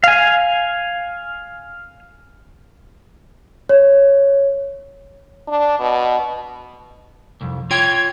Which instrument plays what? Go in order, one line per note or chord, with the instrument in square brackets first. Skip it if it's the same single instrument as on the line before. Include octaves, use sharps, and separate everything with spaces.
[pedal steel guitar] F5 G#5
[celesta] C#5
[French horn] D4
B2
[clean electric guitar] C2 F2
[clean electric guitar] F4 C#5 G5 [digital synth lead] G#6